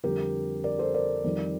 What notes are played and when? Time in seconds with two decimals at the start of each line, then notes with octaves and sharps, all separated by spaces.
0.04 F2 D3 G3 G4 A#4
0.64 A#4 D5
0.79 A4 C5
0.94 A#4 D5
1.24 F2 D#3 G3